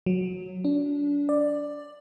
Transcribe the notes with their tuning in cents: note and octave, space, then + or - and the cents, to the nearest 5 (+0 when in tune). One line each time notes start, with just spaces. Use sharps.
F#3 -15
D4 -30
D5 +10